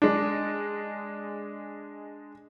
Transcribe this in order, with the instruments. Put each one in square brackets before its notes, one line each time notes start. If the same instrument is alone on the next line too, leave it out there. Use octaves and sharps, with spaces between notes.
[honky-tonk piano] G#3 D4